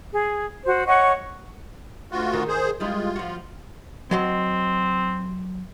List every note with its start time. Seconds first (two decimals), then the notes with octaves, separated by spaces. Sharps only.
0.12 G#4
0.65 F#4 C5
0.87 C#5 D#5 F#5 C#6
2.12 D2 F4 F#4
2.33 D#3
2.48 G#4 C5
2.80 G3 G#3 E4 F4
3.16 F3 F#4
4.11 F#3 C4 D#5 C6